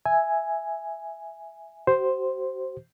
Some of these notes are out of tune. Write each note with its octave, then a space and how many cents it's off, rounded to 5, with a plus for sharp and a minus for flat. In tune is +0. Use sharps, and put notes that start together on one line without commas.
E5 +0 G#5 +0
F#4 +45 C5 +0